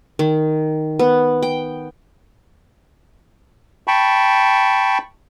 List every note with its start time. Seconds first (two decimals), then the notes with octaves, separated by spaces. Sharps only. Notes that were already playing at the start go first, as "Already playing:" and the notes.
0.19 D#3
0.99 B3
1.42 G5
3.88 G5 A5 B5 C#6